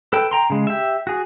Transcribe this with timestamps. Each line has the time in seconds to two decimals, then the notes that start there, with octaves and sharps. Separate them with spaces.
0.13 A4 B4 G5
0.31 G5 A#5 C6
0.50 C#3 G#3
0.67 G4 E5
1.07 F#4 G#4